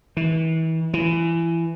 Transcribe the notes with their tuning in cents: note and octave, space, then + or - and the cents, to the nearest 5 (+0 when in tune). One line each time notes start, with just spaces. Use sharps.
E3 -35
E3 +20